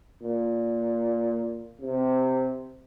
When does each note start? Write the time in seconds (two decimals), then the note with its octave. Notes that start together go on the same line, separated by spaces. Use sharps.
0.23 A#2
1.81 C3